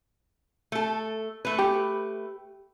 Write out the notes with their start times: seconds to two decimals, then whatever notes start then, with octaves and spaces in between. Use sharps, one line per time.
0.72 A3 A4
1.45 A3 B4
1.59 G4